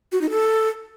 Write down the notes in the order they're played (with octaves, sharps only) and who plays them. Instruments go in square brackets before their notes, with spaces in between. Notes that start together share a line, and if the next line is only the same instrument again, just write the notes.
[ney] F#4
D#4
A4